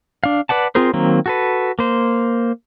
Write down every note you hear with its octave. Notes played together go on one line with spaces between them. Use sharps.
D4 F5
B4 D5 F#5 A5
C4 F4 G#4 A#4 C5
D#3 F#3 A#3 C4
F#4 A4 B4
A#3 C5